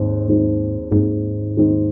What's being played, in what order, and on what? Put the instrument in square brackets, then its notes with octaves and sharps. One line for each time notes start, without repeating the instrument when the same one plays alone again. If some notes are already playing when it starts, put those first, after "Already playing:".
Already playing: [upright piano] D#2 D#3 G#3 C4 [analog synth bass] G#2
[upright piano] D#2 D#3 G#3 C4
[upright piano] D#2 D#3 G#3 C4 [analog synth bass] G#2
[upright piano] D#2 D#3 G#3 C4